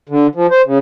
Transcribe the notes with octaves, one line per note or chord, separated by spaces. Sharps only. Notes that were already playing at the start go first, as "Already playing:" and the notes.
D3
F3
C5
C#3